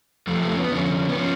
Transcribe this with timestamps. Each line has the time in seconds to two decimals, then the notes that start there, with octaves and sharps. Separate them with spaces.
0.27 F2 F3 A3
0.42 A3
0.52 C#4
0.57 B3
0.72 F2 D3 F3 C#4
1.09 B3
1.15 F3 C#4